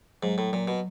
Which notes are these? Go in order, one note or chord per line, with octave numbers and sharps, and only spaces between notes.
G#2 F#3
A2
A#2 F#3
B2